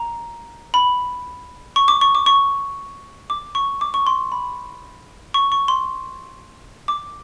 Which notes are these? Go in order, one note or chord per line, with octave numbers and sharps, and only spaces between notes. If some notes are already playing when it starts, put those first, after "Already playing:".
Already playing: A#5
B5
C#6
D6
C#6
D6
C#6
D6
C#6
D6
C#6
C6
B5
C#6
C#6
C6
D6